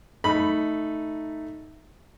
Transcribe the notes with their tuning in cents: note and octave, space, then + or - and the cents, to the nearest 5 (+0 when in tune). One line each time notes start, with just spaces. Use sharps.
A3 +0 D#4 +0 B5 +0